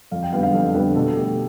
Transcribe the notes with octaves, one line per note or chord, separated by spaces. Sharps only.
F2 F5
G5
D3 G3 B3 F5
F5
F2 A4
D3 G3 B3 B4
B2 A4
A3 G4